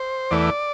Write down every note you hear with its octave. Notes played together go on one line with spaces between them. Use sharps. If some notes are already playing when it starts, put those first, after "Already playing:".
Already playing: C5
E2 E3 A3 D5